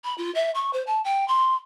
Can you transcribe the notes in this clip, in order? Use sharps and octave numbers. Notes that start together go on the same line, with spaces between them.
B5
F4
E5
C#6
C5
A5
G5
C6